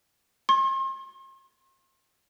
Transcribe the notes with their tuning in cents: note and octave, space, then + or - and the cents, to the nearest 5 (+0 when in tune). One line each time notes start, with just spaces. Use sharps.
C6 +40